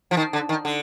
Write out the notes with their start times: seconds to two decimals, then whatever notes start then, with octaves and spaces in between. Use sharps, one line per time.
0.11 F3
0.17 D#3
0.33 D3
0.49 D#3
0.65 D3